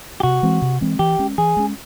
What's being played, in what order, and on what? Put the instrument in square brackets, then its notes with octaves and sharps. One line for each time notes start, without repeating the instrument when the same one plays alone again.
[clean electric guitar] G4
[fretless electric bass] C3 [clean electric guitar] F#4
[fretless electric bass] E3 G#3 C4
C3
E3 G#3 C4
[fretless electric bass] E3 [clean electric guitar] G4
[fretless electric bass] G#3 C#4
[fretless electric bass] E3 [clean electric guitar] G#4
[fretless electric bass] G#3 C#4